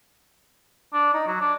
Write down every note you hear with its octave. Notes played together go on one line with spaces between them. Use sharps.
D4
D#4
F#3
D4